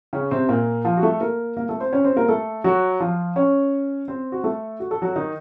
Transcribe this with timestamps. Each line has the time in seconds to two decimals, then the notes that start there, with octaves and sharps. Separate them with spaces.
0.13 C#3 C#4
0.31 C3 C4
0.49 A#2 A#3
0.85 F3 F4
0.97 F#4
1.03 A3 A4
1.21 A#3 A#4
1.57 A#3 A#4
1.69 A3 A4
1.80 C4 C5
1.93 C#4 C#5
2.05 C4 C5
2.16 A#3 A#4
2.29 A3 A4
2.64 F#3 F#4
3.00 F3 F4
3.36 C#4 C#5
4.08 C4 C5
4.32 F#4
4.44 A3 A4
4.80 F#4
4.91 A4
5.02 F#3 F#4
5.16 D#3 D#4